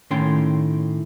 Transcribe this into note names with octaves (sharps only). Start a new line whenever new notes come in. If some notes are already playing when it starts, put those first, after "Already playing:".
A2 D#3 C#4 G5 C6